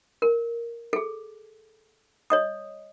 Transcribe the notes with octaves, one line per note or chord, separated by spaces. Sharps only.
A#4
G#4 A4
C#5 D#5 D#6